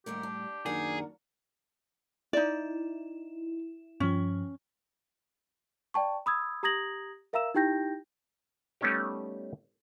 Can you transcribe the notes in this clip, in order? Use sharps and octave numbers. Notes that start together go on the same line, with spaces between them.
D#2 A2 D3 G3 G4 A#4
D4
F#2 D#3 A#3 D4 F#4 G#4 A#4
D#4 E4 D5
G2 F3 C#4
D5 G5 A5 C#6
B5 D#6 E6 G#6
G4 A#5 D#6 G#6 A#6 F#7
A#4 E5 F5 A#5 E6 E7
D#4 E4 G4 G5 G6 A#6
G3 A3 B3 C#4 D#4 G4